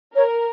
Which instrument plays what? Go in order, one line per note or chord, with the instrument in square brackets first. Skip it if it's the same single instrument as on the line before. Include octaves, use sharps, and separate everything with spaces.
[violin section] A#4 [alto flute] C#5